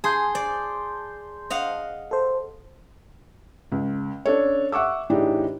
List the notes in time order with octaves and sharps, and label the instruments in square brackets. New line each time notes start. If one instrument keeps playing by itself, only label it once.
[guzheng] G#4 [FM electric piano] A5 C6 G6
[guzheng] D5
D#5 F5 F#5
[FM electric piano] A4 C5
[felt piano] C#2
C#4 D4 A4 C#5
E5 F#5 C#6 D6 E6
A2 E3 D4 D#4 G4 G#4